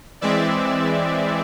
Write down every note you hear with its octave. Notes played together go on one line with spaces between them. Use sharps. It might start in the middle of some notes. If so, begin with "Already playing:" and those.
E3 G#3 C4 D5 E5